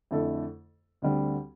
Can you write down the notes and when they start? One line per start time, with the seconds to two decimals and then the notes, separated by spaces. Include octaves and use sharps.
0.11 F2 D3 A3 E4 A4
1.02 D2 D3 G3 C4